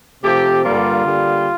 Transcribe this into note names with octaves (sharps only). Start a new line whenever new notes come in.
C3 F3 A3 G4
G2 D3 G3 A#3 F4
D3 G3 A#3